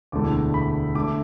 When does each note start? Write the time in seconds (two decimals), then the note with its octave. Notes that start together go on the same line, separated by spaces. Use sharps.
0.12 E1 D2 D3 A3 E4 D6
0.54 B5
0.95 D2 D3 A3 D6